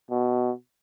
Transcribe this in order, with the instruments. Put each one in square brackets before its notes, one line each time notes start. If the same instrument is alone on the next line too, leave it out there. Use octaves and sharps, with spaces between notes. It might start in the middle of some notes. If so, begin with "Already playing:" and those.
[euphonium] B2